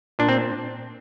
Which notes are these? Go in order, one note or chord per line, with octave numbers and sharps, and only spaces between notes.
A#2 D4
C4